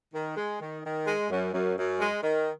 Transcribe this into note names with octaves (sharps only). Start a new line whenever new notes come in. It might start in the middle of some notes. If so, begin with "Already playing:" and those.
D#3
G#3
D#3
D#3
G#3
F#2
F#2
F#2
G#3
D#3